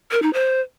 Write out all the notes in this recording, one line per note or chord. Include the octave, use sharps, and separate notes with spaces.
A#4
D#4
C5